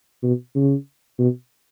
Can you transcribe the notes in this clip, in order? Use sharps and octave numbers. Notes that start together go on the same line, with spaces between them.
B2
C#3
B2